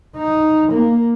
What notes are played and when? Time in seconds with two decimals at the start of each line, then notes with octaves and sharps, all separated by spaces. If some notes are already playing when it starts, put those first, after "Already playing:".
0.17 D#4
0.72 A#3